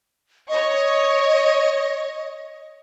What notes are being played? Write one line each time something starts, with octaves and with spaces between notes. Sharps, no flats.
C#5 D#5 C#6